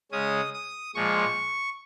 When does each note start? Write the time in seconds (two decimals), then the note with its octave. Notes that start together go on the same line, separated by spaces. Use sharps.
0.12 C#3 G#3 C#4 D#6
0.54 D#6
0.95 A#2 F3 G#3 C#6